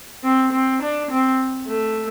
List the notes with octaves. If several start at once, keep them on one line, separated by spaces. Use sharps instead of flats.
C4
C4
D4
C4
A3